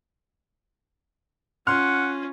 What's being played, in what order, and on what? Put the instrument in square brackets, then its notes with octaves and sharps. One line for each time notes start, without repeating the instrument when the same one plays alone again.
[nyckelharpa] C#4 F4 [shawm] F#5 [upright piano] C6 F6